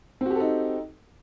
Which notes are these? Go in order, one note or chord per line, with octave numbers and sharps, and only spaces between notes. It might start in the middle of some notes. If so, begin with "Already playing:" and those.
C4 D#4 F#4 G4 A4